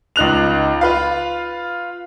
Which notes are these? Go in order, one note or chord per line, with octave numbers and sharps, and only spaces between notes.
C#2 D#4 F#6 F7
F4 B4 F5